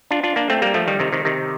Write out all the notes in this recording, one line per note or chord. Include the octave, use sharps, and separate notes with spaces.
D4 F4
D4 F4
A#3 D4
A3 C4
G3 A#3
F3 A3
D#3 G3
C3 D#3
C3 D#3
C3 D#3